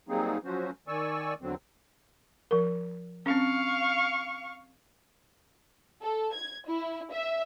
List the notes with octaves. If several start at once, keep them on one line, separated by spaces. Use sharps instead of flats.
F#3 G3 A#3 C4 D#4 G#4
F3 F#3 C#4 F#4 C5
D#3 D5 G#5 C#6 E6
E2 D3 F#3 C4
F3 A#4
C4 C#4 F5 C#6
A4
G#6
E4
E5